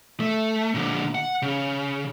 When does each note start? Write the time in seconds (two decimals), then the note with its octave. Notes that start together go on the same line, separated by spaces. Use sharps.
0.20 A3
0.75 A#2 D3
1.15 F#5
1.42 C#3